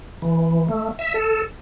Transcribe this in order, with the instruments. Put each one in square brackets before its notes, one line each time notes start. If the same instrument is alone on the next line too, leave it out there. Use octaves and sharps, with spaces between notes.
[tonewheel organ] E3
A3
E5
A4